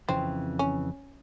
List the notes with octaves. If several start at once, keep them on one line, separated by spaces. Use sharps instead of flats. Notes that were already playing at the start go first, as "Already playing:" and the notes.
F2 C#3 E3 C4
C#4